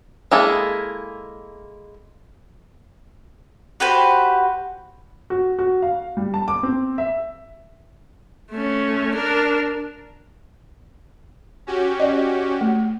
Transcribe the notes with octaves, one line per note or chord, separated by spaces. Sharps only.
G#3 A#3 E4 G#4 A4
F#4 G4 B4 C5
F#4
F#4
F5
G3
A5
D6
C4
E5
A3 C#4
D4 A#4
C#4 F#4 G4
D5 D#5
A3